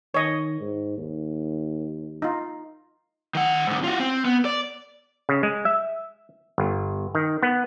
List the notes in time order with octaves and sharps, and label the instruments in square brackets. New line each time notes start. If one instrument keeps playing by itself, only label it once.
[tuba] D#3 [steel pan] C#5 D#5
[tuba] G#2
D#2
[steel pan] D#4 F4
[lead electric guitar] D#3 F#5
G#2 D3
F4 F#4
C4
B3
D5
[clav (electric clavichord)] C#3
G#3
E5
G1
D#3
B3